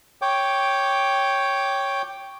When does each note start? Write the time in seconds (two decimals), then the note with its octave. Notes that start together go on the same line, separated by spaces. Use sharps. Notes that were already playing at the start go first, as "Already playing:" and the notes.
0.22 C#5 G5 D6